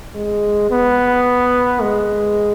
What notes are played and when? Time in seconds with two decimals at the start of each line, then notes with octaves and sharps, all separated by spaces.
0.15 G#3
0.70 B3
1.81 G#3